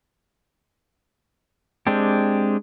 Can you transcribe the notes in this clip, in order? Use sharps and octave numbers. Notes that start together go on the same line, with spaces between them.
G#3 C4 D4 G4